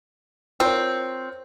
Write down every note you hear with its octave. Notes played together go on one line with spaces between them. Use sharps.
C4 F4 A#4 C#5